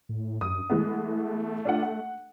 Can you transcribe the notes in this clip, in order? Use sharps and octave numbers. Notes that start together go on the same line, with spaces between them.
A2
F#2 D#6
E3 G#3 A3 B3
D4 F4 F#5
F#5